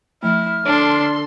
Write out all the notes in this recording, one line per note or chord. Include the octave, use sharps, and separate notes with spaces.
F3 A3 E4 F6
D3 D4 A4 C6